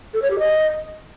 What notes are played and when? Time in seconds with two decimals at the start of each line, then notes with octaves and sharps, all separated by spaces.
0.14 A4
0.22 C#5
0.31 G4
0.39 D#5